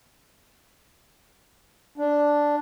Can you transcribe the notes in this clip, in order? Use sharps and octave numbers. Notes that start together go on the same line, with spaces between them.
D4